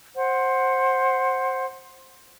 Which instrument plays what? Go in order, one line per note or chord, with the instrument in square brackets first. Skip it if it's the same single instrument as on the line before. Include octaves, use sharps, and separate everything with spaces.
[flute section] C5 F#5